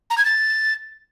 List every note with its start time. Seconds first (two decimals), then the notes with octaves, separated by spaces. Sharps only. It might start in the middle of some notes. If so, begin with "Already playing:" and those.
0.10 A#5
0.18 G#6
0.25 A6